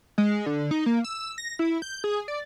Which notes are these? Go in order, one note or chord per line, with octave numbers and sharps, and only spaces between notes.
G#3
D3
D#4
A#3
E6
A#6
E4
G6
G#4
D5